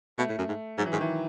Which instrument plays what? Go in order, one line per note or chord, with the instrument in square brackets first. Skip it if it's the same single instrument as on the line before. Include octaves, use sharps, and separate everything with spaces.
[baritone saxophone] B2 [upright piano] A3
[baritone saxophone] A2
F#2
G#2
[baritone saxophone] G#2 [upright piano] F#3
[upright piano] E3
[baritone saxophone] G#2 [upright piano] D#3
[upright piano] E3